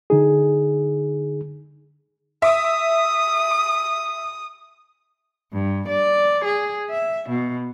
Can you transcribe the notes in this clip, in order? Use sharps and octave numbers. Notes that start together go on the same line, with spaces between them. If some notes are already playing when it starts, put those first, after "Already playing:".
D3 D#4 G#4
E5 D#6
G2
D5
G#4
E5
B2